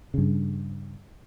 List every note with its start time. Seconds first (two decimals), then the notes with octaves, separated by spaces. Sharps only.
0.14 G2 C#3